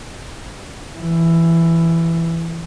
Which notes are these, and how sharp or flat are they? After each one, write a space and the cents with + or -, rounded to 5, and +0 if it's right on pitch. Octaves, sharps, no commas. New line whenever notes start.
E3 +10